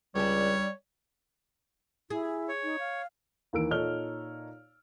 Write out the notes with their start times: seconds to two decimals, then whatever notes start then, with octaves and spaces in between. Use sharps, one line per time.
0.15 C#2 G3 D4 G4 C#5
2.10 E4 G#4
2.49 C#5
2.63 D#4
2.79 F5
3.53 D#2 E3 A#3 E6 D7
3.70 A#2 D#4 A4 C#5 F6 G7